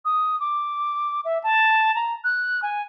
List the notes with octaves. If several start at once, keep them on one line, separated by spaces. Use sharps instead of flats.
D#6
D6
E5
A5
A#5
F#6
G#5